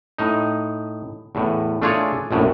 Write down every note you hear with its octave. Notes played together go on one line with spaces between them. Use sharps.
A2 D#4
E2 A2
A3 D4 F4 G#4 C#5
A#1 F#2 A2